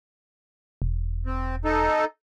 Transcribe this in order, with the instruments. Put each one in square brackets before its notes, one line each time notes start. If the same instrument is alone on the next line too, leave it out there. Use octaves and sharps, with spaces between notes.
[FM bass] E1
[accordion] C4
D#4 A4